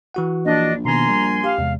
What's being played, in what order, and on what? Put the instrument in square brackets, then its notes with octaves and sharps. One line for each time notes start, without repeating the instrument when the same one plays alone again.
[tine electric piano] E3 F#4 F#5
[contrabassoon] A#1 [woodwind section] D4 [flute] D#5
[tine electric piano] B2 D#3 B3 [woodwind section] A#4 G#5 C6 [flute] A#5
[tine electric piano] G3
[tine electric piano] G4 [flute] F5
[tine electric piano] E2 C3 G#3